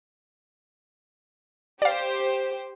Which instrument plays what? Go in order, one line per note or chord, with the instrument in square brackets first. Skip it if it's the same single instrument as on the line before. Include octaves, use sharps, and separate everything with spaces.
[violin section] G4 C5 [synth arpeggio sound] D5 F5